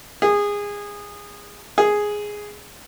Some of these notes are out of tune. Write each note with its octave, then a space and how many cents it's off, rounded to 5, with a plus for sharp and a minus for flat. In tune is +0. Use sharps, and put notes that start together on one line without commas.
G#4 -20
G#4 +0